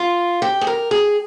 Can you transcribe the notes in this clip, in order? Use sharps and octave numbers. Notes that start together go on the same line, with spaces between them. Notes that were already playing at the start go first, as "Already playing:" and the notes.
Already playing: F4
G4
G#4
A#4
G#4